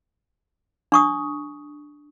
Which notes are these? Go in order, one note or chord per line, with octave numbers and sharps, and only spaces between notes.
D4 C#6 D#6